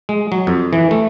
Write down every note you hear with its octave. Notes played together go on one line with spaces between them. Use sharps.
G#3
F#3
F2
E3
A3